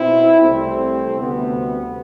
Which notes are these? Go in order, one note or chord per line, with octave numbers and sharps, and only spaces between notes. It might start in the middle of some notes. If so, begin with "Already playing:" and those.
Already playing: B2 C4 E4
C2 C3 E3 G3 A3 C4
D2 C3 G3 B3